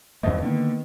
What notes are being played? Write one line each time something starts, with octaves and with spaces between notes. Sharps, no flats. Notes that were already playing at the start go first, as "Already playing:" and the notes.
G#1 E2 G2 A3 C5 D#5
D3 D#3 A#3 B3